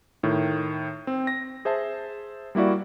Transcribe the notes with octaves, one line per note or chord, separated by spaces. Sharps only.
A2 D#3
C4
A#6
G#4 C5 E5 A5
G3 A#3 E4 F#4 D5